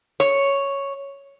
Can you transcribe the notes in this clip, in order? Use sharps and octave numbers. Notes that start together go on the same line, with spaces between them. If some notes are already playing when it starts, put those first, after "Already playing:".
C#5